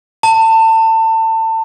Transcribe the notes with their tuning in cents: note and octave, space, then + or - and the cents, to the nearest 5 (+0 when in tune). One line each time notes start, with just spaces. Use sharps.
A5 +30